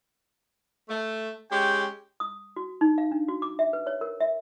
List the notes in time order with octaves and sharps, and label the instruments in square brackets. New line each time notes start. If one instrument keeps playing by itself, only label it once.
[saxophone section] A3
[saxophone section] G#3 C#4 G4 [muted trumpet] G5
[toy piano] D#6
F#4
D#4
F5
D4
F#4
D6
E5
B4
C#5
A#4
E5